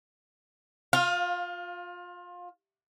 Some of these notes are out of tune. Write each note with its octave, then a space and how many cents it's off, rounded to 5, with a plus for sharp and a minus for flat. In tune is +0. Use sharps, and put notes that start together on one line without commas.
F4 +25 F5 +0